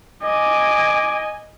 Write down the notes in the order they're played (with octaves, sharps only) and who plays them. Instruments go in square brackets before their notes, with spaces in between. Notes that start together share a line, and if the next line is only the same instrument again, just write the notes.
[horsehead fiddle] D#5 G#5 [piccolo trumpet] D6